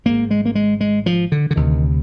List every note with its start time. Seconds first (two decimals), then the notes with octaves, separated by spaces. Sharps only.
0.05 G#1 G#2 A#3
0.31 G#3
0.45 A#3
0.55 G#3
0.81 G#3
1.06 F3
1.32 D3
1.51 D3
1.56 D2 C3 D#3